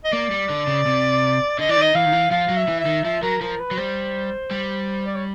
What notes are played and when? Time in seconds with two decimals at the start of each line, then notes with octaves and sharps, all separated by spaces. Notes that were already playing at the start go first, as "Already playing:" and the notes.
0.04 D#5
0.12 A#3 D5
0.31 G3
0.50 D3
0.67 C#3
0.86 C3
1.59 D3 D#5
1.69 E3 D5
1.77 D#3 D#5
1.95 E3 F5
2.06 D#3
2.13 E3
2.31 F3 F5
2.50 F#3
2.57 E5
2.68 E3
2.80 E5
2.86 D#3
3.04 F3 E5
3.22 F#3 A#4
3.41 F3 A#4
3.59 B4
3.71 F#3
3.77 G3 C5
4.51 G3
5.06 D5
5.15 C#5